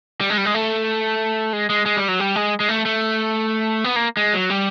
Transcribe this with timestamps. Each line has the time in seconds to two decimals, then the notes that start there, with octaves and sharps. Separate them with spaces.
0.20 G3
0.30 G#3
0.37 G3
0.45 G#3
0.54 A3
1.53 G#3
1.70 G#3
1.86 G#3
1.97 G3
2.08 F#3
2.20 G3
2.36 G#3
2.60 G#3
2.69 A3
2.85 A3
3.84 B3
3.96 A#3
4.17 G#3
4.34 F#3
4.50 G3